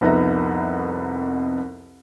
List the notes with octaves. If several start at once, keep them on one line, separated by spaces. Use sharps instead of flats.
C2 F2 B3 D#4 E5 A#5